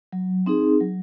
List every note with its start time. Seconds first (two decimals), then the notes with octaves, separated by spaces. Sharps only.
0.12 F#3
0.46 C4 D#4 G#4
0.80 F#3